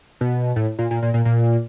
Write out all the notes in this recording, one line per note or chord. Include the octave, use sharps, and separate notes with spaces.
B2
A2
A#2
A#2
A#2
A#2
A#2